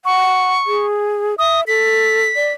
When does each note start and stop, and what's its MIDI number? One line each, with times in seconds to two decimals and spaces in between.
0.05 0.53 78
0.05 0.86 85
0.67 1.35 68
1.39 1.63 76
1.39 1.61 87
1.67 2.25 69
1.67 2.52 95
2.36 2.49 74